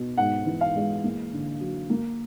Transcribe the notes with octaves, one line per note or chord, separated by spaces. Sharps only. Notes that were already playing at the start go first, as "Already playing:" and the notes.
Already playing: B2
G#2 F#5
E3
F5
G#3
A#3
D3
F#3
A#3